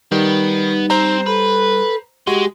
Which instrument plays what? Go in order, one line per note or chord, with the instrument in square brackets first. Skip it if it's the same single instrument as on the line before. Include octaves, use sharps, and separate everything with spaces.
[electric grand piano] D#3 [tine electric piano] G3 [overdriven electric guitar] B3 [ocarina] D#4
[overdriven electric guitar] C4 [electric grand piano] C5 A#5
[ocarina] A4 [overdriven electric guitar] B4
[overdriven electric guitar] G#3 [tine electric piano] F#4 [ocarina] G4